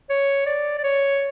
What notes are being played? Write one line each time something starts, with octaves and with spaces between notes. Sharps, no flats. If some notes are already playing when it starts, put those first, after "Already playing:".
C#5
D5
D5
C#5